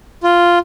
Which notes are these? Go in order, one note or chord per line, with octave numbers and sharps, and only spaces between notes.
F4